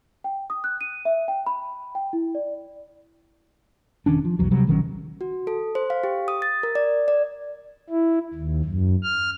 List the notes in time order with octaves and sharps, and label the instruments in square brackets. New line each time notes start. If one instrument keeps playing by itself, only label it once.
[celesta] G5
D#6
F#6
D#7
E5
G5
B5
G5
E4
D5
[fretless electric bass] E1 D#3 C#4 D4
F3
B1 E2 F#3
C3 F#3 G3
A#1 D#3 F#3 C#4
[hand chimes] F#4
A4
C5
F5
G4
D#6
A6
A#4
D5
D5
[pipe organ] E4
D#2
F#2
F6